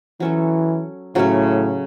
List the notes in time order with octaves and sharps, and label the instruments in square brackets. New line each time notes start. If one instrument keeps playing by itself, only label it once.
[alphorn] E3 [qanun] F#3 C#4 F#4 A4
[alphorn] A2 [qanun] C#3 F#3 A3 C#4